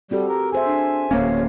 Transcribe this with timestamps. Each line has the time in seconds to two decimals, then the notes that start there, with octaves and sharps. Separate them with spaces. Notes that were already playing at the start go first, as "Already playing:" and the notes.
0.11 G3 C4 F#4 G4 A4
0.29 A#4
0.52 G#4 C5 E5 G#5
0.65 D4
1.11 D1 A#3 C#4 C#5 F5